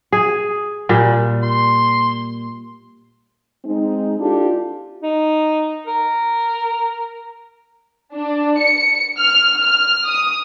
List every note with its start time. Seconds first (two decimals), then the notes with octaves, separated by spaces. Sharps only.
0.12 G#4
0.89 A#2 G3
1.43 C6
3.65 G#3 C4 D#4
4.20 D4 E4 F4 G4 A4
5.03 D#4
5.87 A#4
8.13 D4
8.58 C#7
9.18 F6
9.62 F6
10.06 D#6